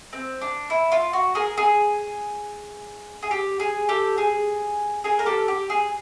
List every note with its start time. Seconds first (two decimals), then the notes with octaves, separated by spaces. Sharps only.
0.13 C4
0.41 D4
0.70 E4
0.92 F4
1.13 F#4
1.35 G#4 A#4
1.57 G#4
3.22 G#4
3.31 G4
3.60 G#4
3.89 G4 A4
4.18 G#4
5.04 G#4 A#4
5.19 A#4
5.26 G4 A4
5.48 G4
5.70 G#4